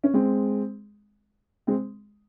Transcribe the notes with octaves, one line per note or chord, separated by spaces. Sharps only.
C#4
G#3 C4
G#3 C4